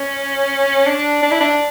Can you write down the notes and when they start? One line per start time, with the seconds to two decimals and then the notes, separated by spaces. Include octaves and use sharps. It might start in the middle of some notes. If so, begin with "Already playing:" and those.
Already playing: C#4
0.86 D4
1.23 D4
1.31 E4
1.40 D4